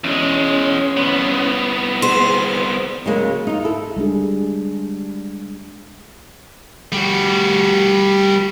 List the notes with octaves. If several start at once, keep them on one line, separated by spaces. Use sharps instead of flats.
E2 G#3 C#4 C#5 C6
C2 B3
G#4 C5
C#3 F#3 G#3 A#3
D#4 F4
E4 A4
G3 G#3 D4 G#4
G3 F#4